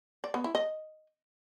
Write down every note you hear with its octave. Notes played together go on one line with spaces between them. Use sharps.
D5
B3
E4
D#5